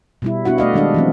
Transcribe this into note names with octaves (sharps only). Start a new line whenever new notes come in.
B2 G3 E4
B3 D4 E4 F#4 F#5
A3 D5 D#5 F5
D#3 G3 G#3 D4 F5
E3 F#3 C4